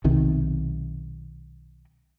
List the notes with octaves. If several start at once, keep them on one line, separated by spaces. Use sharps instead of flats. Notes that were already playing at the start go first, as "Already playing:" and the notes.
B1 C3 D#3